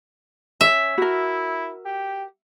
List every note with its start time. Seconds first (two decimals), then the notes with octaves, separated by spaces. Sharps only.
0.61 C#4 E5
0.98 E4 F#4 A#4
1.86 G4